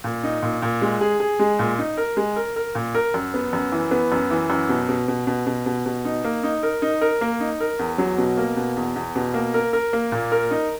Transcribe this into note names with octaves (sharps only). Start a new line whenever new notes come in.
A#2
D#4
A#2
A#2
G#3
G#4
G#4
G#3
A#2
D#4
A#4
G#3
A#4
A#4
A#2
A#4
F#2
B3
F#2
E3
B3
F#2
E3
F#2
B2
B2
B2
B2
B2
B2
B2
D#4
A#3
D#4
A#4
D#4
A#4
A#3
D#4
A#4
E2
F#3
B2
A#3
B2
E2
E2
B2
A#3
A#4
A#4
A#3
A#2
A#4
D#4